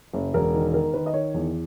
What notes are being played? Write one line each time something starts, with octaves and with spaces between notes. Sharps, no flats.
F#1
E1 A#4
D#3
D#3 A#4
D#3 B4
D#5
D#3 C#5
E2